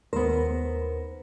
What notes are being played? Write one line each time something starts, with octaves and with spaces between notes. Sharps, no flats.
D#2 B3 A#4 C5